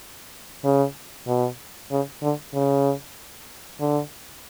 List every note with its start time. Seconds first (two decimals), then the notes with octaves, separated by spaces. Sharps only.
0.64 C#3
1.27 B2
1.91 C#3
2.22 D3
2.54 C#3
3.81 D3